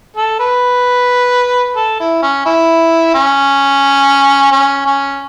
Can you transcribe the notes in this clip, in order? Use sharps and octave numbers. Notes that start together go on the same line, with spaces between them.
A4
B4
A4
E4
C#4
E4
C#4
C#4
C#4